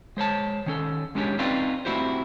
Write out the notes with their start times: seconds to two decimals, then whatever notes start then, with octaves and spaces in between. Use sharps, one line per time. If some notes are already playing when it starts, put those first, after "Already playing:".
0.17 G#3 C5 C#5 A5
0.66 D#3 C#4 A4
1.15 G#3 C#4 D4 G4 C#5
1.39 C4 C#4 D#4 F4 B4 D5
1.85 A3 C4 E4 F#4 G4 C5